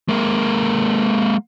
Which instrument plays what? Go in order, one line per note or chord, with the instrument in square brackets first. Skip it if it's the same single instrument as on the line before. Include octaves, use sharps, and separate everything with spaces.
[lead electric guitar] G#3 A#3